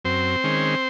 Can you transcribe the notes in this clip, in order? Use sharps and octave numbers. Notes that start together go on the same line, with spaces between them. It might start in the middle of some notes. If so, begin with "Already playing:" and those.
F#2 C4 C5
D#3 G#3 C#4